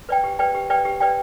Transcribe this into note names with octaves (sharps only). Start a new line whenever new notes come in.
B4 D5 G5
G4
B4 D5 G5
G4
B4 D5 G5
G4
B4 D5 G5